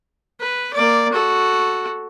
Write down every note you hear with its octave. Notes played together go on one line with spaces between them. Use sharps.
B4
A#3 D5
F#4 A4